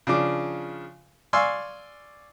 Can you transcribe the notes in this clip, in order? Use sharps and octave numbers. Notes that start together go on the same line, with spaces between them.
C#3 F3 D4 D6
D5 F5 G#5 C6 C#6 E6